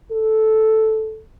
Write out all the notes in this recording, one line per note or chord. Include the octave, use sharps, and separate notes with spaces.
A4